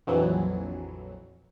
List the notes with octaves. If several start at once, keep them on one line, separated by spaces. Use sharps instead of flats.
A#1 F2 E3 F#3